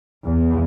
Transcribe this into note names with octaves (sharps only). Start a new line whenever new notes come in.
E2